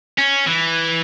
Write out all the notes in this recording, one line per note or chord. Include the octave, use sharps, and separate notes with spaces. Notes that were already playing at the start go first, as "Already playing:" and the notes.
C#4
E3